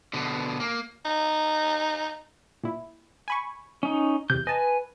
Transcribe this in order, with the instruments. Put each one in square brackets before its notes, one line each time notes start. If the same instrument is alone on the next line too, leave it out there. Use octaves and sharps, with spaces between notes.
[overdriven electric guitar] B2 D3
A#3
[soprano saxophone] D#4
[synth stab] A#2 E4
G#5 B5 C#6
[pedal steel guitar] C#4 D#4
[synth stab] E2 C3 [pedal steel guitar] G6
[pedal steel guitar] B4 G#5 [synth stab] D#5 A5